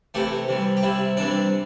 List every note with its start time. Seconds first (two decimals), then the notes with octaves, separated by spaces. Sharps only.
0.14 C3 E3 A3 G4
0.48 C3 E3 G3
0.77 G4
0.83 C3 G3 E4
1.17 C3 E3 G3 D4